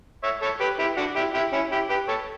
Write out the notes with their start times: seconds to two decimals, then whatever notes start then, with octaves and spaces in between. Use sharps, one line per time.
0.23 C#5 E5
0.42 A4 C#5
0.61 G4 B4
0.79 E4 G4
0.97 D4 F#4
1.16 E4 G4
1.34 E4 G4
1.53 C#4 E4
1.72 E4 G4
1.89 G4 B4
2.08 A4 C#5